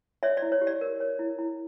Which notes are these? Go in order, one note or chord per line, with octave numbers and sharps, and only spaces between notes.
C#5 D5 E5
D5
E4
C#5
G4
D5
A#4
C#5
E4
E4